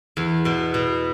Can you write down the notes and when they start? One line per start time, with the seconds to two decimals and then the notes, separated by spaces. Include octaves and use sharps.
0.17 E2
0.45 B2
0.74 B2